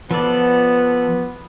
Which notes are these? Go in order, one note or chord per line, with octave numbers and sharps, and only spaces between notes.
F3 B3 A4 D5